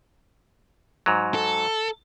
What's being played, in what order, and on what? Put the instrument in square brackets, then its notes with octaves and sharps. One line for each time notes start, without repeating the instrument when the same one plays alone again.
[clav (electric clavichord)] G#2 F#3
[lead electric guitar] A4